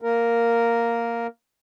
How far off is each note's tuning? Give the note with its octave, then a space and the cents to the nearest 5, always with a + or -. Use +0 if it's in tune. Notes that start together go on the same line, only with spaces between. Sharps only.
A#3 +0 A#4 +0